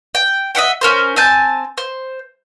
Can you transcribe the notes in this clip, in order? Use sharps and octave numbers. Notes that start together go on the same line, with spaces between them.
G5
D#5 E5 F#5 G5
C#4 A#4 C5
C4 G#5 A5 G6
C5